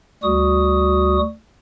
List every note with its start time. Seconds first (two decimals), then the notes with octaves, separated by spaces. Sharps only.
0.23 D2 G3 F#4 D#6